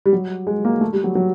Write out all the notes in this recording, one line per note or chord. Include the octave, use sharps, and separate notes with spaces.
G3
F#3
G#3
A#3
A3
G3
F#3
F#3